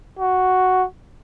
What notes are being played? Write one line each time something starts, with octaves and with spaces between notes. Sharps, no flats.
F#4